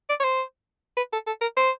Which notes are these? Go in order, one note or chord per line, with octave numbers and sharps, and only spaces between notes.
D5
C#5
C5
B4
A4
A4
A#4
C5